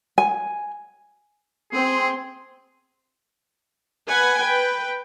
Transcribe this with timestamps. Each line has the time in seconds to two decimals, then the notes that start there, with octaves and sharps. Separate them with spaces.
0.18 G#5
1.73 C4 G#4 C6
4.07 B4 F#5 G#5
4.39 B4 G5